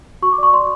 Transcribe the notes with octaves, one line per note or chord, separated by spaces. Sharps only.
F#4 C#6
D6
D5 C#6
D5 C6